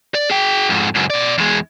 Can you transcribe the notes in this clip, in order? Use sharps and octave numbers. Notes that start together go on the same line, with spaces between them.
D5
G#4 G5
F2 G#2
C#2 F#2
B2 D5
E2 G#3